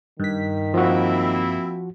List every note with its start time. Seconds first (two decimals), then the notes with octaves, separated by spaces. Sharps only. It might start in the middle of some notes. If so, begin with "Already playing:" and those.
0.20 G2 D#3 B6
0.74 F3 A#3 C4 E4 F#4